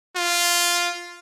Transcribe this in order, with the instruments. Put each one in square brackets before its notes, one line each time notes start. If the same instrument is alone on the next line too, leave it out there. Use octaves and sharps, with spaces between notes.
[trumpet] F4